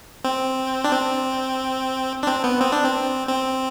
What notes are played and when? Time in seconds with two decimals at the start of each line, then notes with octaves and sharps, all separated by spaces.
0.25 C4
0.84 D4
0.91 C4
2.23 D4
2.27 C4
2.44 B3
2.61 C4
2.72 D4
2.84 C4
3.29 C4